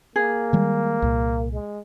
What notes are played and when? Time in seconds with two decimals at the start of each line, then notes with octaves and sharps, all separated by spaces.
0.16 A#3 G#4
0.53 D#3 G3 G#3
1.02 C2 A#2
1.52 G#3